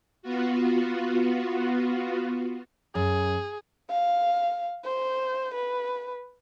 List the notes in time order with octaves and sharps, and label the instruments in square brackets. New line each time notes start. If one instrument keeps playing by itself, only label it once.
[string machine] B3 F4 F#4
[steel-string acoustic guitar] F#2 [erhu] G#4
[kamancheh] F5
C5
B4